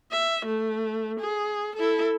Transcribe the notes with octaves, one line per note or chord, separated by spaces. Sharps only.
E5
A3
G#4
E4 A4